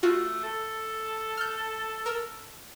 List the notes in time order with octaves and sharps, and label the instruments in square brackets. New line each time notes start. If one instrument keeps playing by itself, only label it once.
[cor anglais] A3 [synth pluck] F4 F#4
[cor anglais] A4
[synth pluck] F6 G6
A#4 E6